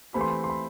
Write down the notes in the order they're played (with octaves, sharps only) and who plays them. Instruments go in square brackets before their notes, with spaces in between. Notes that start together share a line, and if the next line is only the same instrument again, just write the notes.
[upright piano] E3 A3 C4 G4 [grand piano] B5
[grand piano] C6
B5
C6
B5